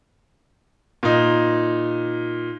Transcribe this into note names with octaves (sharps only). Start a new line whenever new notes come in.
A#2 D#4